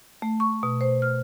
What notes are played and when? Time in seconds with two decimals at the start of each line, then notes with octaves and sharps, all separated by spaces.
0.22 A3
0.40 C#6
0.63 B2
0.81 C5
1.02 F6